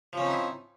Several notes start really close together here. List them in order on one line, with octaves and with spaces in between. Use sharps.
F3 C#4 C4 D#4 E4